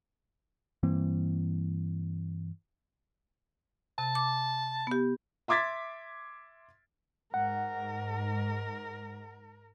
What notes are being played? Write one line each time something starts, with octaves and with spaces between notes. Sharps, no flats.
G2 E3 A#3 C4
C3 A5
D6
B3 G4
E5 C6 D6 G#6 A6 B6
G#2 A#4 F#5